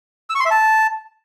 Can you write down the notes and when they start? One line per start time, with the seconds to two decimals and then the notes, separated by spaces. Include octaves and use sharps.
0.30 E6
0.35 C#6
0.40 C6
0.45 E5
0.51 A5